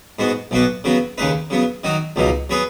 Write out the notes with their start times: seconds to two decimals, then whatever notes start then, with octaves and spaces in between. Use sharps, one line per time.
0.19 G#2 G#3 B3 F#4
0.51 B1 B2 B3 F#4 B4
0.84 C#3 F#3 B3 F#4
1.18 D#2 C#3 G#3 D#4 B4
1.50 C#3 F#3 B3
1.84 D#3 F#3 D#4 F#4
2.16 C#2 B2 F#3 D#4
2.50 F#3 B3 G#4 B4